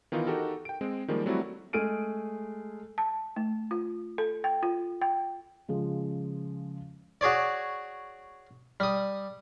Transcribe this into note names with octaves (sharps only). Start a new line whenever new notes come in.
D#3 E3 B3 D#4 F4
D#4 F#4 G4 A4 A#4
G5 D7
G#3 C4
D#3 F3 G3 G#3 A#3
F#3 G3 A3 C4 E4 F#4
G#3 A3 G#4 F6 D7 D#7
A5
A3
F4
A4
G5
F4
G5
C#3 F3 G#3
F#4 G#4 C#5 D5
G3 D#6